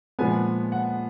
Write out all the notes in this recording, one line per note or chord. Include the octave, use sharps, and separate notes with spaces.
A#2 F3 G#3 B3 G#5
F#5